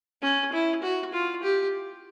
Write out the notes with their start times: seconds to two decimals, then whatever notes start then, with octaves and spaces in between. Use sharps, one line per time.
0.22 C#4
0.53 E4
0.83 F#4
1.13 F4
1.43 G4